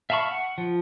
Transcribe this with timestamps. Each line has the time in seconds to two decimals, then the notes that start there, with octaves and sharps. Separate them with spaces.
0.10 E5 F5 A5 B5 C#6
0.31 F#5
0.58 F3